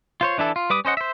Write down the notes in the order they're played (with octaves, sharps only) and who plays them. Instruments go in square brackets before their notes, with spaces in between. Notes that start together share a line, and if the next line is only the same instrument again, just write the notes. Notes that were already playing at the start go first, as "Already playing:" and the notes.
[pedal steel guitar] F4 C5 C#5
E3 D4 E4 A4
F4
G3 B4 D6 D#6
C#4 C5 D#5 F#5
C5 E5